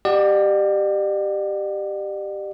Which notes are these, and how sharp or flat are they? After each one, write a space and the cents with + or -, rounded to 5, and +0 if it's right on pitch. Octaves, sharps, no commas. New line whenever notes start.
G4 +0 D5 +40 F#5 +0